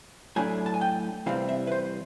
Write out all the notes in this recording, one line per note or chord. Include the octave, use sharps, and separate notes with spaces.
A2 F#3 A3 D4 G#5
A5
G#5
G5
C3 E3 G3 C4 F5
E5
B4
C5